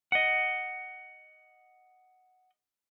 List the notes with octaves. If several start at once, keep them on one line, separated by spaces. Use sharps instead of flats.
D#5 F#5